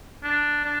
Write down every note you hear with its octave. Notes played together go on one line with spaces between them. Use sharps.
D4
D4